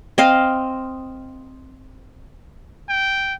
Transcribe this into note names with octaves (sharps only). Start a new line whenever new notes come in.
C4 D#5 F5
G5